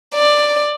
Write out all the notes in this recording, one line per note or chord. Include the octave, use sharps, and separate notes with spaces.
D5